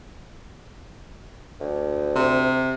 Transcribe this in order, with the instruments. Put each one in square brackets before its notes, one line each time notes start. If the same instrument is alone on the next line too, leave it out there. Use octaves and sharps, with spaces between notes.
[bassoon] D2
[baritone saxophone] C3